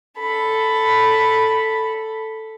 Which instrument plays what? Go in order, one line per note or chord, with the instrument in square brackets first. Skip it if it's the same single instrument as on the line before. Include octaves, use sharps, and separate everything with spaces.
[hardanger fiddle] A4 B5